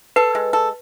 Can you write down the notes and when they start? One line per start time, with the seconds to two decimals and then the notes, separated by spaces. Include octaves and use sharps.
0.16 A4 B4
0.35 G#3
0.53 A4